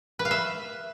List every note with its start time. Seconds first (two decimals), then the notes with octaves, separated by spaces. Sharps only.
0.19 B4
0.25 F5
0.31 E5